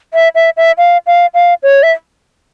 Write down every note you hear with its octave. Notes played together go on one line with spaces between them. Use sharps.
E5
E5
E5
F5
F5
F5
C#5
E5